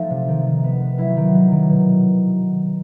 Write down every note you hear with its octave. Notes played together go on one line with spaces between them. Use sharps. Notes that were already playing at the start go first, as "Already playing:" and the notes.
Already playing: F3 A3 D#4
C3
D#3
D#3
B3
B3
F#3 E4
D#3
F#3
D#3
B2